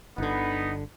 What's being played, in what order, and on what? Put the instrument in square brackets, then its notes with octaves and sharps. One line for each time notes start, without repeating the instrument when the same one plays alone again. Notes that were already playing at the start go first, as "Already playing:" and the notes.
[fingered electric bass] G1 D3 [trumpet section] B3 D#4